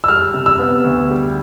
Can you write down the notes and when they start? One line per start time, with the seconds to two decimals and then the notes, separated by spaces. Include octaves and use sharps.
0.04 E6
0.08 G3 F6
0.34 C3
0.46 E6
0.59 B3
0.84 D2
1.11 G3